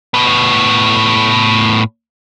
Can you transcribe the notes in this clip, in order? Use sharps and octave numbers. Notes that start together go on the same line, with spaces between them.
A2 B3